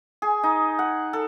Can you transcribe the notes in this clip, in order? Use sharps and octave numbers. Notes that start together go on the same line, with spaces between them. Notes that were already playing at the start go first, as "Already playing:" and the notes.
G#4
D#4
F#5
A4